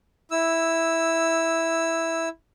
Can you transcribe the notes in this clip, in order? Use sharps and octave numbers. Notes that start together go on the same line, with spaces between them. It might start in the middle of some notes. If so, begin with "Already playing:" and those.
E4 E6